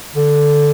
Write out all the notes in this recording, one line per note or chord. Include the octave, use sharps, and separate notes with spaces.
D3